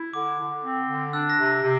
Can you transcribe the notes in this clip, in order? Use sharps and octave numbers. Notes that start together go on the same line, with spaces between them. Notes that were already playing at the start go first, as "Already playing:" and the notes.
Already playing: E4
D3 D6
D3
C4
D3
D4 E6
A#6
C3
A#6
C3